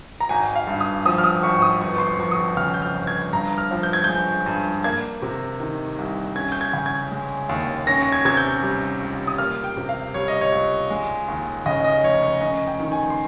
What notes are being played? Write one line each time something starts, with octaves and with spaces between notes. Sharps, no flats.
A#5
G#1 G#5
F5
G2
D#6
F3 D#6
F6
D#6
G#1 C#6
D#6
G1 C#6
C6
C#6
F2 C#6
D#6
C#3 F6
G6
F6
G1
G#6
G2 A#5
F6
F3
G6
G#6
G#3 G6
G2
A#3 G#6
C3
D#3
C2
C#4 G#6
G6
G#6
C#3
G#6
G#3
D#2
C#4 A#6
A#6
G#6
C3 G#6
G6
G3
C#2
D#6
A#3 F6
G5
C3
F5
G3 C#5
D#5
C#5
C#2
G#3
D#2
C#3 D#5
D#5
F1 C#5
C#5
C#4 D#5
G5
D#3
G#5
C6